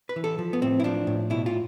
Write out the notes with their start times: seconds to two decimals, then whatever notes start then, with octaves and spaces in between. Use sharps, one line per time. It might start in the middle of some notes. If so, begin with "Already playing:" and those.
0.09 B4
0.16 E3
0.24 A4
0.39 F3
0.53 B3
0.62 A2 C4
0.80 E4
0.84 F3 D4
1.07 A2
1.30 B2 E4
1.46 F4